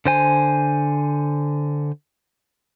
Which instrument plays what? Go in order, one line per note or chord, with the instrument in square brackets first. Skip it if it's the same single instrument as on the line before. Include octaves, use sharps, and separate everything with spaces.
[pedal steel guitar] D3 C5 G#5